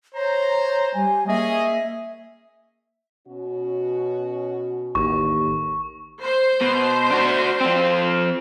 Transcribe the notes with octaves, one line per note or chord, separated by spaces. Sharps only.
C5 C#5 A#5
G3 G#5
A#3 C#4 G#4 D#5 E5
B2 C#4 F#4
A1 D#2 C#6
C5
B2
D4 F#4
F3 C4